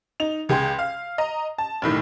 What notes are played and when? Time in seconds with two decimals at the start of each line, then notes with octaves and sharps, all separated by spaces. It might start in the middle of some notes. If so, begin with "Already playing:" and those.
0.20 D#4 F7
0.49 C#2 G#4 G5 C6
0.79 F5
1.18 D#5 A#5
1.58 A5
1.82 F1 B1 A2 D#3